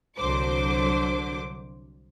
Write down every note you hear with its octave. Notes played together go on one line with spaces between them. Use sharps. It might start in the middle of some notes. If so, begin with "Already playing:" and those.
C2 D3 F#3 C5 D6